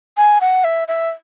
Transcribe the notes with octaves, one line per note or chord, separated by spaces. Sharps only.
G#5
F#5
E5
E5